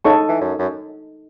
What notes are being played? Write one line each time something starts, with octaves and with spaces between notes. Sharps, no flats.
C#3 D#4 A4 D#5 A5 C#6
E3
F#2
F#2